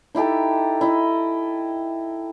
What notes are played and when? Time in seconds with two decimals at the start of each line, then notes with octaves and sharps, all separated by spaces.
0.15 D#4 E4 G4 A4
0.81 E4 D#5